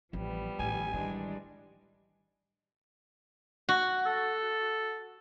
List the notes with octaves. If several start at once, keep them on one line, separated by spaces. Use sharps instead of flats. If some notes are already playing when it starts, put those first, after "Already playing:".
A1 F3 G3 B3
A1 D#3 G#5
D#3 E3 G3 G#3 D4
F#4
A4